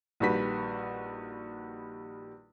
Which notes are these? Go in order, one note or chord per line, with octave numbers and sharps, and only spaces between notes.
A#1 D#3 G3 F#4 B4 B6